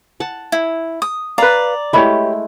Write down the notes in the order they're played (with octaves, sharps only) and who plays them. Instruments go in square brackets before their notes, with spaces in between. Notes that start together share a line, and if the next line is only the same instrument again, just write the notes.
[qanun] F#5 A5
[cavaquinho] E4
D#6
[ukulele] B4 F5 [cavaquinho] D5 A#5
[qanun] G#3 A3 E4 [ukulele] G4 C#5 B5